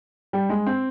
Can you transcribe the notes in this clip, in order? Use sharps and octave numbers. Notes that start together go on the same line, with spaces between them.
G3
G#3
C4